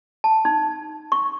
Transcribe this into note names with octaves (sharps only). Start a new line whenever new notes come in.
A5
D#4
C#6